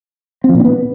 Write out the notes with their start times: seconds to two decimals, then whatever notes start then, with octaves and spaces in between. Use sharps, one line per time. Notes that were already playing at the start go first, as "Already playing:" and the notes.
0.44 C4
0.49 F3
0.54 A#2
0.60 D4
0.65 B3